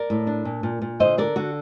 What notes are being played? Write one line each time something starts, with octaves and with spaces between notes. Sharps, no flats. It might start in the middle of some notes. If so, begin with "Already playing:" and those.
Already playing: A#4 D5
A2
D4
A#2
A#2
A#2
D3 C5 D#5
D3 A#4 D5
D3 F#4